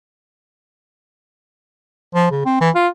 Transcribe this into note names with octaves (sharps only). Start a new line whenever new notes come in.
F3
C#3
C4
E3
F4